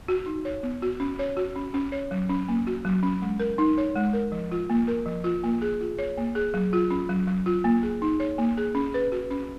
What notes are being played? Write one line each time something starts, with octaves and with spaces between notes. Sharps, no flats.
F#4
D#4
C#5
B3
F#4
C#4
C#5
F#4
C#4
C#4
C#5
F#3
C#4
A#3
F#4
F#3
C#4
G#3
A#4
D#4
C#5
G#3
A#4
F3
F4
A#3
A#4
F3
F4
A#3
G#4
F4
C#5
A#3
G#4
F#3
F4
C#4
F#3
F#3
F4
A#3
G#4
D#4
C#5
A#3
G#4
C#4
B4
F#4
C#4